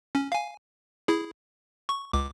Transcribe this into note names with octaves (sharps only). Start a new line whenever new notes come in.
C#4
F5 G#5
E4 G#4
C#6
C#2 D6